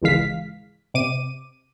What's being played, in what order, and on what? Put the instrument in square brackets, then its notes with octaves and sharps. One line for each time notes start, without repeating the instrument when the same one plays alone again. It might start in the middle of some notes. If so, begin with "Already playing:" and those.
[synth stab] G#1 C#2 E3 G#3 F5 B6
C3 D6 D#7